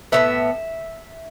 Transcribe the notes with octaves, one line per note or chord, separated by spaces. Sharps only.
A2 G3 B3 E5